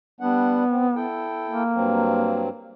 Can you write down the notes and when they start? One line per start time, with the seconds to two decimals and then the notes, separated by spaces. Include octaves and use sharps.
0.20 G3 B3 D4 F#5
0.70 C4
0.96 E4 A4 G5
1.49 A#3
1.74 G2 F#3 C4